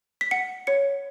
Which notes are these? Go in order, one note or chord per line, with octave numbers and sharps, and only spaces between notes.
B6
F#5 C#7
C#5 C#7